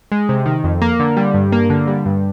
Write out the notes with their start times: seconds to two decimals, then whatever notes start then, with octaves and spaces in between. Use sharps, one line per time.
0.12 G#3
0.29 C3
0.46 D#3
0.64 F2
0.81 A#3
0.99 D3
1.17 G3
1.34 G2
1.52 A#3
1.70 D3
1.87 G3
2.06 G2